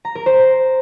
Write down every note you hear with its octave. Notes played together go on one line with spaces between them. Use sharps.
A#5
A#4
C5